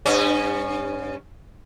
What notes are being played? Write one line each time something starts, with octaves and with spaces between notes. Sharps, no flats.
G2 C#4